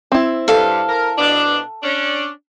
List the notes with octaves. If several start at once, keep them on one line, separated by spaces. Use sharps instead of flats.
C4 E4
G2 A4 F5
A#4
B2 D4
C#4 D4